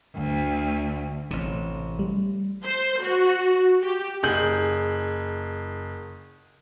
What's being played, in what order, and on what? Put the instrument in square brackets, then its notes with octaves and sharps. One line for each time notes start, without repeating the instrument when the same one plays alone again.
[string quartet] D2
[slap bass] A1 C3
[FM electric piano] G3
[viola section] C5
F#4
G4
[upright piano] F#1 G#4 G6 F#7